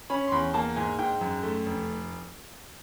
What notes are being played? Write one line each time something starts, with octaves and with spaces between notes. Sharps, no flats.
C#4 B5
C6
E2 B5
A#3 A5
G#2 G#5
G#2 G5
F#2
A3
F1